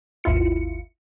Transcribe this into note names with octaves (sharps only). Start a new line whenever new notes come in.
G#1 D#2 E4 F4 C#7